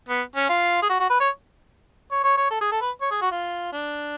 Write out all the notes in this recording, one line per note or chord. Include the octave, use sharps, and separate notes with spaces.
B3
C#4
F4
G#4
F#4
F#4
B4
C#5
C#5
C#5
C#5
A4
G#4
A4
B4
C#5
G#4
F#4
F4
D4